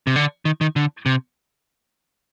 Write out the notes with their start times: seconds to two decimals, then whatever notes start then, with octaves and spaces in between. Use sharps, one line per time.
0.07 C3
0.16 D3
0.45 D#3
0.61 D#3
0.76 D3
1.06 C3